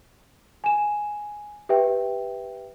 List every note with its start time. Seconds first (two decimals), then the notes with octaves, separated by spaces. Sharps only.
0.64 G#5 E7
1.69 G4 B4 E5 G5